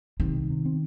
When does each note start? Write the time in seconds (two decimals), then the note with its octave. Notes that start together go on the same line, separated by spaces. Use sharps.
0.20 C3 D#3
0.35 C2
0.50 C3
0.66 C4